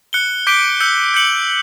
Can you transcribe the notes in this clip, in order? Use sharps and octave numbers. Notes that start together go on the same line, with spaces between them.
F#6 C#7 G7
D6 G6 B6 D7 G7
E6 G6 C#7 G7
G6 C#7 F#7